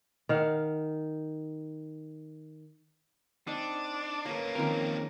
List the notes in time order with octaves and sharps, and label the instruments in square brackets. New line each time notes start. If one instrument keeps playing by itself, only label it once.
[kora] D#3 F5 F#5
[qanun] C4 [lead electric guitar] D4 [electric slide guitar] D#4
[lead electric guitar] C#3 A#3 [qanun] B4 C#5
[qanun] D#3 F3 C#4 [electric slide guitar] C4 A#4